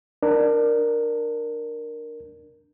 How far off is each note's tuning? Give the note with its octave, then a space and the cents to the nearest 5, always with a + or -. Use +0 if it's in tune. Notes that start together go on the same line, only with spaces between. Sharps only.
D4 +20 A#4 +0